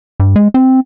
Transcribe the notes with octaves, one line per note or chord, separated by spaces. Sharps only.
G2
G#3
C4